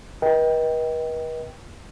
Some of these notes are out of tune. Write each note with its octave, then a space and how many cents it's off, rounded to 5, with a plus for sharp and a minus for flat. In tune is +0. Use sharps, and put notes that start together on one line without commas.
B4 -45 D#5 +25 G5 +0